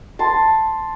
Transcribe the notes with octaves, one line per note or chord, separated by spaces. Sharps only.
A5 C6